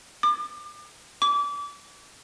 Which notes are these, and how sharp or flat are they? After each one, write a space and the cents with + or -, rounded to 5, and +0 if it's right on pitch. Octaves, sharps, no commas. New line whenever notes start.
D6 +35
D6 -30